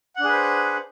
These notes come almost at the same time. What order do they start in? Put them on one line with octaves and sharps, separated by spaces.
F#5 D4 G#4 B4 C5